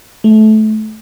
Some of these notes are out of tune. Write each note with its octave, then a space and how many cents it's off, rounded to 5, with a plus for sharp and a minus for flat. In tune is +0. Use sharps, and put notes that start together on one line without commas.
A3 -25